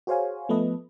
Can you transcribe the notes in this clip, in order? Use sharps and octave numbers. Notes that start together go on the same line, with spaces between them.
F#4 G#4 C5 C#5 F5 G#5
F3 A3 B3 A4 B4 D#5